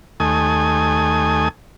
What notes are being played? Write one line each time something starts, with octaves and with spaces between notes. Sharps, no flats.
D#2 A3 G#5 D#6